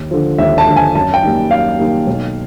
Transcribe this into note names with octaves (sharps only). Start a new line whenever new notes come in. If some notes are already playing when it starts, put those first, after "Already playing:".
Already playing: D#2
D3 F3
D#2 E5
A5
D3 F3
G#5
F#2 A5
G5
D#3 G3 A#3
F#2 F5
D#3 G3 A#3
B1